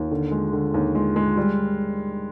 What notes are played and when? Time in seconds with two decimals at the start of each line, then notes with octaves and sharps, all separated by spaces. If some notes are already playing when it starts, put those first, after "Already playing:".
Already playing: D#2
0.11 D3
0.31 G#3
0.53 D3
0.74 D#2
0.95 G#3
1.16 G#3
1.37 G3